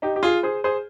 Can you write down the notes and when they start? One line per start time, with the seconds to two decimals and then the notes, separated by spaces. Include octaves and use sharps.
0.02 D#4 G4
0.16 G4
0.23 F4 G#4
0.43 G#4 C5
0.64 G#4 C5